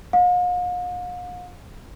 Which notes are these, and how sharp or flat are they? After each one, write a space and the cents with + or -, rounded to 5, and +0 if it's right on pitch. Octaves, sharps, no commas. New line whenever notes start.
F5 +45